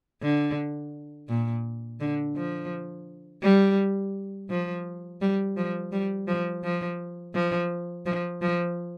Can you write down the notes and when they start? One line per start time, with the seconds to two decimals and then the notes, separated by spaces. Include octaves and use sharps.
0.22 D3
1.29 A#2
2.00 D3
2.36 F3
3.43 G3
4.50 F3
5.21 G3
5.57 F3
5.92 G3
6.28 F3
6.64 F3
7.35 F3
8.06 F3
8.42 F3